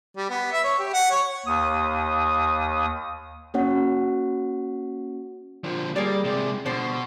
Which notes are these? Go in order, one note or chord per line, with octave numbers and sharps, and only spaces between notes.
G3
B3
E5
C#5
G4
F#5
C#5
D#2 D#6
A#3 C#4 F#4 C#5 F#5
D3 F3
G3 A#3 G#4 D5
C3 G#3
B2 D3 F3 C5